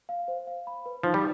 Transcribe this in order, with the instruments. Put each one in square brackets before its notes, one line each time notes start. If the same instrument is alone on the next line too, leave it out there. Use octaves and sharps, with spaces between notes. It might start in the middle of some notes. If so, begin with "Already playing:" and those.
[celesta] F5
C5
F5
B5
B4
[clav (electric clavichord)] F3 [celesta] D#4
[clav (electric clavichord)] G3